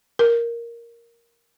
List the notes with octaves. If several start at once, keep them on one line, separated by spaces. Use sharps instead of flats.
A#4